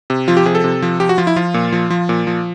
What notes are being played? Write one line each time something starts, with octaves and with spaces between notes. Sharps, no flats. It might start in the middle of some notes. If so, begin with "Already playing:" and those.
C3
F3 F4
G4
C3 G#4
A4
C3
F3
F3 G4
F#4
F3 F4
E4
F3 F4
A#2
F3
F3
A#2
F3